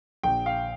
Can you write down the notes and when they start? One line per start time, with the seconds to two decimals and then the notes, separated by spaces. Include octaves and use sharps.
0.23 A#1 G5
0.46 F5